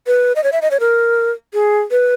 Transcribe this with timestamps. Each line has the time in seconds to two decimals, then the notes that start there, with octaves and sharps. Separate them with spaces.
0.07 B4
0.36 D#5
0.44 C#5
0.52 E5
0.62 D#5
0.71 C#5
0.80 A#4
1.54 G#4
1.91 B4